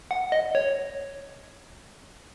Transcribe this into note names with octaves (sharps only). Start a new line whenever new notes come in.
F#5
D#5
C#5